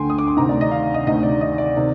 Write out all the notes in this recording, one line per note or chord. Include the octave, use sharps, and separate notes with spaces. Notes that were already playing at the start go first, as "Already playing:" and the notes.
Already playing: D2 D3 G5 G#5 C6
D#6
D6
C6
D2 C3 D#3 A#5
D5
D#5
F5
D#5
D2 C3 D#3 D#5
D5
D#5
D5
C3 D#3